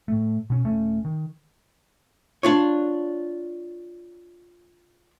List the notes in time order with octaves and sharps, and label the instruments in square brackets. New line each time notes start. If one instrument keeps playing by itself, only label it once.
[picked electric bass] A2 A3
B2 C#4
D#1 A3 C#4
D#3
[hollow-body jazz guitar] D4 F4 C#5